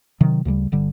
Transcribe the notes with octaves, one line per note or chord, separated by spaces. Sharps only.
C3 D#3 F#3
D2 C#3 F#3 G3
G1 D3 G3